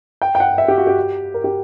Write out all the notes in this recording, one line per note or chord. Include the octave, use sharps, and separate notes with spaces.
G5
G5
F#5
E5
G4
F#4
G4
A#4
G4